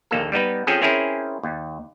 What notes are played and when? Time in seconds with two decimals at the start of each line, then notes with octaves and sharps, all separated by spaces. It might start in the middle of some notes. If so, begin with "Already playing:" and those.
0.11 A#1 D#2 A#3 A4
0.32 G3 B3 D#4 B4
0.67 F3 C4 C#4 G#4 A4
0.82 C4 C#4 E4 G#4 A#4
1.43 D#2